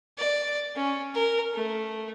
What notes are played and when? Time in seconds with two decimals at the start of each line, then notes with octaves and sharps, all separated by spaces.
0.18 D5
0.75 C#4
1.14 A#4
1.53 A3